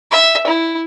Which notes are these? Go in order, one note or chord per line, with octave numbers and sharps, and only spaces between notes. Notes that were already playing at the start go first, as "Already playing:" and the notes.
E5
E4